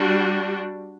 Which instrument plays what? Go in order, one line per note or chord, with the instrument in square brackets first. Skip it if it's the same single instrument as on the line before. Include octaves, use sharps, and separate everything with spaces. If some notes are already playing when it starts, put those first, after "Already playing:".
Already playing: [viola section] G3 D4 F#4